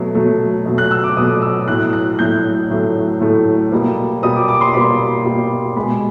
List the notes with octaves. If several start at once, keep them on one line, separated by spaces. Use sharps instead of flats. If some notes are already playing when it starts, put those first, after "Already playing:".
Already playing: B2 F#3 A3
B2 F#3 A3
B2 F#3 A3
F#6
E6
D6
B2 F#3 A3 D#6
E6
A2 F#3 A3 F#6
F#6
A2 F#3 A3 G6
A2 F#3 A3
A2 F#3 A3
B2 G3 A#3
B2 G3 A#3 D#6
D6
D6
C6
B2 G3 A#3 B5
B2 G3 A#3
B2 G#3 B5